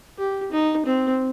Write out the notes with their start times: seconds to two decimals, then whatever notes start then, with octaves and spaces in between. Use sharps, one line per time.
0.18 G4
0.52 D#4
0.86 C4